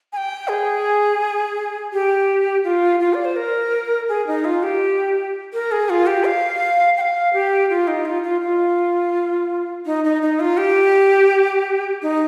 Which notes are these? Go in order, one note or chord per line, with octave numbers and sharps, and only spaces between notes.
G#5
G5
G#4
G4
F4
F4
D5
C5
A#4
G#4
D#4
F4
G4
A#4
G#4
F4
G4
F5
G5
F5
G4
F4
D#4
F4
F4
F4
D#4
D#4
D#4
F4
G4
D#4